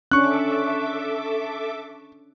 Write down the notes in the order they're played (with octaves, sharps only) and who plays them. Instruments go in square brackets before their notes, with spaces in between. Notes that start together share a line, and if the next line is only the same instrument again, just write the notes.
[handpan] C#4 D4 [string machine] A4 E5 D6 [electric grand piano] C#6 F#6